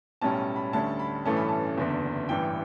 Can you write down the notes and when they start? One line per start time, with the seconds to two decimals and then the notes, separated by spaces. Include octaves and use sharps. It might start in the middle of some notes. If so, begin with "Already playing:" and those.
0.21 B1 A2 G3 C#4 A5
0.56 B5
0.73 D2 D3 G3 C#4 A5
0.99 B5
1.25 A1 G2 E3 A3 C#4 A5
1.37 B5
1.48 A5
1.78 F#1 E2 D3
2.29 A1 G2 E3 G5